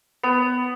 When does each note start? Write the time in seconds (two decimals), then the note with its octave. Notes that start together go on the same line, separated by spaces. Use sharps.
0.23 B3